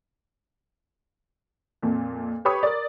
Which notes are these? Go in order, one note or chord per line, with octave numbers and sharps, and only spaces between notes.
F2 A#2
G4 B4 C#5 B5 C#6 D#6
A#4 D5